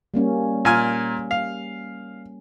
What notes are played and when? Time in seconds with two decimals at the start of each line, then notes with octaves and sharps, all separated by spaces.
0.14 G3 A#3 C#4
0.65 A#2 G#5 F6
1.31 F5